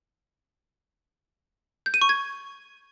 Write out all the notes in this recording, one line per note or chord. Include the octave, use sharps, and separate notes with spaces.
G6
D#7
C#6
G#6